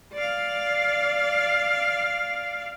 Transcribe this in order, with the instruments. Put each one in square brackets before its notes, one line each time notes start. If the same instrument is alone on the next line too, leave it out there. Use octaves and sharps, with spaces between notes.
[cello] D5 F5